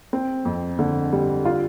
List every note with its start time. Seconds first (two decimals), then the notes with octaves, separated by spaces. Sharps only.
0.13 C4
0.45 F2
0.79 D3
1.13 G3
1.45 F4